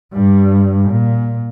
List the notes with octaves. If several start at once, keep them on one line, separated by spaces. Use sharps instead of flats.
G2 G3
A#2